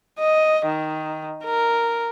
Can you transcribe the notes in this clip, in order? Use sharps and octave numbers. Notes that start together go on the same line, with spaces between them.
D#5
D#3
A#4